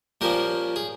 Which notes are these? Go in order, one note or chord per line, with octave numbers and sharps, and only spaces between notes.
A#2 F3 A#3 C#4 G4 A#4
G#4